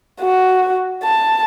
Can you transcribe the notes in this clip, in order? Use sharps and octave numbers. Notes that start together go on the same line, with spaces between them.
F#4
A5